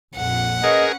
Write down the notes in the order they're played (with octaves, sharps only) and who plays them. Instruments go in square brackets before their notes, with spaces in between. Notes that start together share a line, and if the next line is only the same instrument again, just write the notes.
[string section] A#1 F2 [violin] F#5
[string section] C#4 B4 [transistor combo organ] G#4 A#4 [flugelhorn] D#5